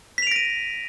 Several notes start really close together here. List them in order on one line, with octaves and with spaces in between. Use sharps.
B6 F7 D7 A#6 D#7